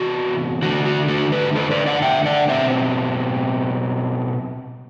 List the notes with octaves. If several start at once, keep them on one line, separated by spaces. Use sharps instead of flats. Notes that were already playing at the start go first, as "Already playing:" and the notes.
Already playing: C3 E3 B3 F#4
D3 A3 D4 F#4
F#4
F#4 A4
G4 B4
A4 C5
B4 D5
D5 F#5
E5 G5
D5 F#5
B2 F#3 C4 C5 E5